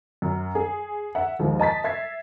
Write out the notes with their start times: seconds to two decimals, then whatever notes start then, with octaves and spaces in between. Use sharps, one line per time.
0.22 F#2
0.55 G#4
1.15 E5 F#5
1.39 D#2 G#2 F3 G#3
1.60 D#5 A5 A6 B6
1.84 E5 G#6 C7